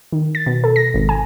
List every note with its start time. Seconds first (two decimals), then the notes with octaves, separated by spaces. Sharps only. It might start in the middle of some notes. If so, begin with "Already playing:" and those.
0.12 D#3
0.35 A6
0.46 B2
0.64 A4
0.76 A#6
0.94 G#1
1.09 G#5